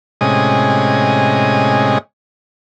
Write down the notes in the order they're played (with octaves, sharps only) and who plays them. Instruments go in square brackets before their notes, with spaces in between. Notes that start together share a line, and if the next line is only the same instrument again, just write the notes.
[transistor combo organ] A2 C3 G#3 C#4 D#5 G#5